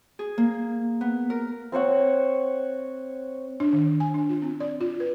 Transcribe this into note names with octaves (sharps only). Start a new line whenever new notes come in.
G#4
A#3
B3
A#4
C4 C5 C#5 F#5
D4
D#3
G#5
D4
F4
C4
D5
F4
B4